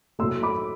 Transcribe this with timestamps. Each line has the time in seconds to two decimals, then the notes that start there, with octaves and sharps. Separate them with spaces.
0.19 A2 F#3 A3 C6 E6
0.43 B5 D6